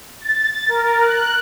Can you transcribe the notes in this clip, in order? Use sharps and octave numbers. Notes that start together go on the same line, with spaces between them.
A6
A#4
F#6